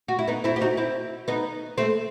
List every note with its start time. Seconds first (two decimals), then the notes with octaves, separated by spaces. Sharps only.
0.08 F#4
0.19 E4
0.28 B3 D#4
0.44 C4 E4
0.56 G4
0.61 D#4 F#4
0.77 C4 E4
1.28 B3 D#4
1.78 A3 C4